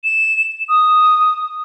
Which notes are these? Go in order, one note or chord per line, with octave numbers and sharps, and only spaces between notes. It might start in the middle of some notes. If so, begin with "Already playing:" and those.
E7
D#6